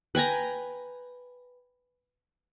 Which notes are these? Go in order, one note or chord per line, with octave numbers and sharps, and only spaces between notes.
B4 G5 G#5 A#5